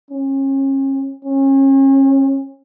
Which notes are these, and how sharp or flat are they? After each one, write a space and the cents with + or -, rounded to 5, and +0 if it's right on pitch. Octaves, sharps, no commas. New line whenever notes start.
C#4 -35
C#4 -35